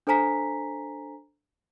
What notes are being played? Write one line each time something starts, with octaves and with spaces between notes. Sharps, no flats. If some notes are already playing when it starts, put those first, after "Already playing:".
D4 A4 C5 G#5 A#5 B6